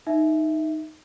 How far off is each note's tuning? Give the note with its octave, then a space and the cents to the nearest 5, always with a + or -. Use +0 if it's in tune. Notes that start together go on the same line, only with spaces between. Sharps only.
D#4 +0 E5 +0